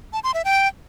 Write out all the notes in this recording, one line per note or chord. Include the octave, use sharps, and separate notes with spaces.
A5
C6
E5
G5